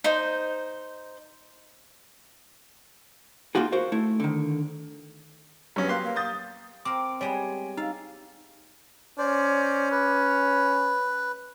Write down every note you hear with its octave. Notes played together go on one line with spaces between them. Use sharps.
D#4 C5
A#3 D#4 F4 F#4 G#4
F#4 A#4 C5 F5
A3 E4
D3 D#3
G2 F#3 B3 C#4
A#3 G4 C6 F#6
A#3
D#6 G6 A6
C4 A#4 D6
G3 G#3 B3 C#5 G#5
D#4 F5
C#4 C5 D5
B4